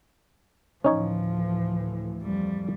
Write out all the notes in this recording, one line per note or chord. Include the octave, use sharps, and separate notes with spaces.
D2 A2 E3 F3 C#4 D#4 C#5
F2 G3